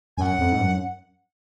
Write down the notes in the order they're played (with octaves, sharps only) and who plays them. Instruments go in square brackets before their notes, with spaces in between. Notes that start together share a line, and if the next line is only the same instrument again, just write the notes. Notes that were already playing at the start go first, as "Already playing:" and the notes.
[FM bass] F#2 [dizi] F#5 G#5
[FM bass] F2
G#2
F#2